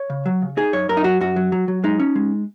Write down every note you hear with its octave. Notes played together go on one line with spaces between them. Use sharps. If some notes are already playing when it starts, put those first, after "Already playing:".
Already playing: C#5
C#3
F#3
C#3
D#4 G#4
F#2 C#5
F#2 A#4
D#4
F#3 F#4
F#2 F#4
F#3
F#3
F#3
G#3 D#4
C#4
G#3